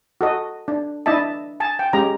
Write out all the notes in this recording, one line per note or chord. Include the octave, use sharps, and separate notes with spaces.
F#4 A4 D#5
D4
D4 E4 D#5 E5 A5
G#5 A5
G5
G#3 C#4 G4 A#5